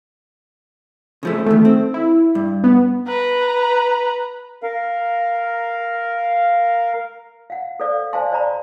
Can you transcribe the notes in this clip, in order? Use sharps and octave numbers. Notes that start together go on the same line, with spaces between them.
C#3 F3 A3
E2 D#3 A3
C4
E4
G2
B3
B4 A#5
A#4 F5
F5 F#5
A4 A#4 C5 D5 F5
C5 D5 F5 G#5 A5 C6
C5 D5 A#5 B5